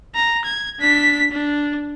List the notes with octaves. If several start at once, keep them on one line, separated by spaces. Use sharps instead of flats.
A#5
G#6
D4 B6
D4